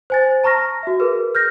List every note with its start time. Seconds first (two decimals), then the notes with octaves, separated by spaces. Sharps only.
0.10 C5 G#5 A6
0.44 A5 A#5 C#6 F6 A#6
0.83 F#4 E5
1.00 G#4 A#4 B4
1.35 F6 G6 A#6